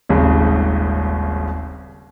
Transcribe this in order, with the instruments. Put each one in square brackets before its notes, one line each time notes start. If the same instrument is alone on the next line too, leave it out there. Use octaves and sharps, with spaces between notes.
[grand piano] D#1 G#1 D#2 C#3 G#3